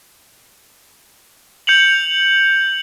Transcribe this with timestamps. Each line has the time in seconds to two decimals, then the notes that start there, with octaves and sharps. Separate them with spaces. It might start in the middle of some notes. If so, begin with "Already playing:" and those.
1.67 G6 C#7 F7 F#7